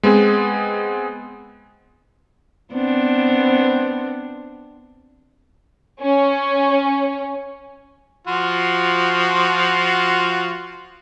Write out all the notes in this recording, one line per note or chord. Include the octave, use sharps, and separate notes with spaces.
G#3 B3 C4 G#4
B3 C4 D4
C#4
F3 F4 F#4